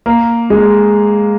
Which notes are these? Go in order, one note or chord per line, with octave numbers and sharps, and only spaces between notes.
A#3
G#3